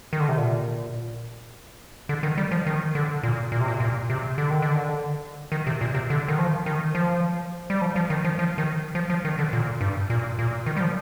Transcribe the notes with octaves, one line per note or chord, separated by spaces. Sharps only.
D#3
D3
C3
A#2
D3
D#3
G3
F3
D#3
D3
A#2
A#2
C3
A#2
A#2
C3
D3
D#3
D3
D#3
C3
A#2
C3
D3
D#3
F3
D#3
F3
G3
F3
F3
D#3
F3
F3
D#3
F3
F3
D#3
D3
A#2
G2
A#2
A#2
D#3
G3
F3